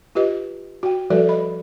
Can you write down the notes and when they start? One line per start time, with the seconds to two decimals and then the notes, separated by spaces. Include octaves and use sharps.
0.15 F4 G4 B4 D#5
0.83 F#4 G5
1.10 F3 G3 F#4 A4 B4 D5
1.28 D#5 B5